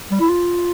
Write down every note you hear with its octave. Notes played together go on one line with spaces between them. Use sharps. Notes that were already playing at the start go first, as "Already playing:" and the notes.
G3
E4
F4